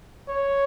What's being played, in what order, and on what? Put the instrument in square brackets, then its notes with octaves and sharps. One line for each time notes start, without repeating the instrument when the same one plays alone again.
[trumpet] C#5